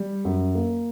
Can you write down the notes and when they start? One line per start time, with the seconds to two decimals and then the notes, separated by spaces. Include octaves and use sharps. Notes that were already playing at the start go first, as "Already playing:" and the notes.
Already playing: G3
0.25 F#2
0.55 A#3